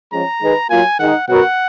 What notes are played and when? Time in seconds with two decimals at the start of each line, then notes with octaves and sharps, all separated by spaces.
0.12 F3 G#3 C#4 A#5
0.42 D#3 G#3 D#4 G#4 B4
0.70 F#3 A#3 F4 G#5
0.99 D#3 G#3 D#4 F#5
1.28 B2 F#3 B3 F#4 A#4 F#5